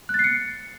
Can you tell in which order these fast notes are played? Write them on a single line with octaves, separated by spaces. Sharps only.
F#6 A6 C7 C#7